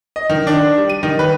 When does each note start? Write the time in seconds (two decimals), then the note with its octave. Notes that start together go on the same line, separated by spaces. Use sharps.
0.16 D#5
0.29 D#3
0.47 D4
0.78 G3
0.89 D#7
1.03 D#3
1.19 B4